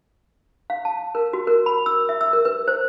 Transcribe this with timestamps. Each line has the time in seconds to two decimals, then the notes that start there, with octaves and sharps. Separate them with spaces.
0.70 F5
0.85 A5
1.15 A#4
1.33 F#4
1.47 A#4
1.66 B5
1.86 E6
2.09 E5
2.21 E6
2.33 A#4
2.45 B4
2.68 C5